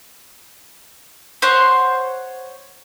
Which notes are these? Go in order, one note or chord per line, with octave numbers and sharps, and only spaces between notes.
C5 C#5 F#5 C6